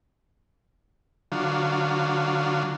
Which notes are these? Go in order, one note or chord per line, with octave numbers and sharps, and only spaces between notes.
D3 F#3 F4